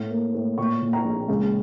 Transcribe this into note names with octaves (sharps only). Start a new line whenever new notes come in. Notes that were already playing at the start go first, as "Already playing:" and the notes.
Already playing: A2
A#3
A2
A#2 C#6
A#2
A#5
A#1
C#2